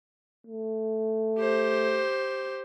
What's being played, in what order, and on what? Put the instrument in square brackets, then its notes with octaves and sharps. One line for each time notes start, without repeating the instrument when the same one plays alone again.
[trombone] A3
[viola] G4 C5